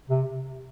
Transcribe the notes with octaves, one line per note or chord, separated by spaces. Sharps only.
C3